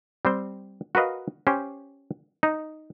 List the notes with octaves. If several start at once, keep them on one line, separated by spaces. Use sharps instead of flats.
G3 C4 C5
F#4 A#4 B4 D#5 F5
C#4 G4 C5 C#5
D#4